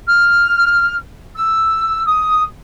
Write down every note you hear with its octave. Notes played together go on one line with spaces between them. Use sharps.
F6
E6
D#6